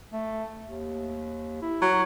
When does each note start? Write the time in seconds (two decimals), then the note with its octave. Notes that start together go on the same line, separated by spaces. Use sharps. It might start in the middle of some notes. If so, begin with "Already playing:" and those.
0.13 A3
0.62 D#2
1.62 E4
1.82 F#3